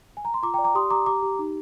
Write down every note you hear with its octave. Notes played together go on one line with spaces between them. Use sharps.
G#5
A#5
C6
F4 A#5 D6
G5 A#5
D5
A#5 D6
G4 C6 D#6
G4 A#5 D6
G4 A#5 D6
G4
D#4